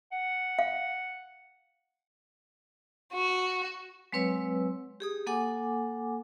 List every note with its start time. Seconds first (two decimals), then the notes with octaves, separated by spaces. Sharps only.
0.12 F#5
0.59 F5
3.13 F#4
4.12 F#3 G#3 C4 B4 C#5 E6
5.00 G4 G#4 D#6
5.27 A#3 A4 F#5 G#5 D6